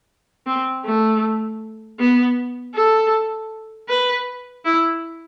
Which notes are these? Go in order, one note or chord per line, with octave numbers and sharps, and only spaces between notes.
C4
A3
B3
A4
B4
E4